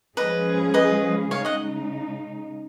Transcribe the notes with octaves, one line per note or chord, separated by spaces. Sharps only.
F3 G#3 C#4 G#4 B4 D#5
B4 D#5
C#3 G#3 D#4 C#5 F5
D#5 F#5